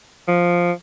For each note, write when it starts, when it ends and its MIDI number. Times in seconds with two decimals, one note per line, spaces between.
0.28 0.72 53